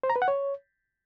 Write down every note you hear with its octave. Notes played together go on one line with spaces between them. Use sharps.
C5
A#5
B4
F#5
C#5